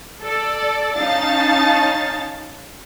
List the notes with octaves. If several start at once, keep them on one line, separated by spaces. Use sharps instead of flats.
A4 D5
C#4 D#4 F5 A5 A6